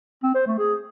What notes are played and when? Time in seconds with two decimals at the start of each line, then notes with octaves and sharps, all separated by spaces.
0.23 C4
0.35 C5
0.47 A3
0.58 G#4